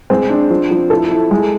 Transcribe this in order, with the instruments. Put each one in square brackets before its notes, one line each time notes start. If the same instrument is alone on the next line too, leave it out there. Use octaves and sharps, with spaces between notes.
[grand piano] G#3 [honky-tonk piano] C4
[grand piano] D4
F3
F3
[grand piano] E4 [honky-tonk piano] A4
[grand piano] E4
G#3